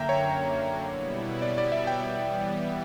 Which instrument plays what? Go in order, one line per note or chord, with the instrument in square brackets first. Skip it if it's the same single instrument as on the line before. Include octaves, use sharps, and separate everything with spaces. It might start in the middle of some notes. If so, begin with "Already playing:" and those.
Already playing: [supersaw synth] F#2 D3 A#3 [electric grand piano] E5 G5 A#5
[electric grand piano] C#5
[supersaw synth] B2 G3 B3 E4
[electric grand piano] D5
D5
E5
G5
[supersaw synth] E3 G3 B3